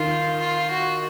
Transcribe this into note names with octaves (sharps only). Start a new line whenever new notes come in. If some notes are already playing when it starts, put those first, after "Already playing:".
Already playing: D#3 F4
F4
F#4